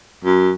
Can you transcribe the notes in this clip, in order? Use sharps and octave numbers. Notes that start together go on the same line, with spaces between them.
F#2